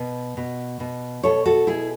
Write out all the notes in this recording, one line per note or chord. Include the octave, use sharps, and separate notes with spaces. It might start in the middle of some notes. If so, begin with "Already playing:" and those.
Already playing: B2 B4
B2
B2
B2 A4 C#5
F#4 A4
B2 E4 G#4